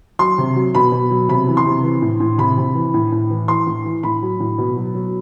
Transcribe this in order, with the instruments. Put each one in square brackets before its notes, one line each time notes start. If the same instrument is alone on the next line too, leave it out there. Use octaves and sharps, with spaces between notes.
[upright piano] F#3 C6
C3
F#3
B2 B5
B2
F#3
C3 B5
E3
C6
C3
E3
A2
A2
C3 B5
C3
E3
A2
A2
E3
E3 C6
A2
E3
A2 B5
F#3
A2
B2
F#3
F#3